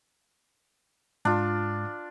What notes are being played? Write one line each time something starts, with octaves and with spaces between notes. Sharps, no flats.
G#2 D4 F4